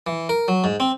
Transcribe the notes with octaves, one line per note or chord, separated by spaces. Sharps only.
E3
A#4
F#3
G#2
C4